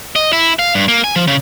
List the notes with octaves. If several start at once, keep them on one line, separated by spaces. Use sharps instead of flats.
D#5
E4
F5
G2
A#3
G#5
F3
C#3